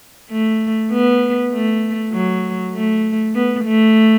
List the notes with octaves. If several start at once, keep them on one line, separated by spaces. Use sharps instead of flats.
A3
B3
A3
F#3
A3
B3
A3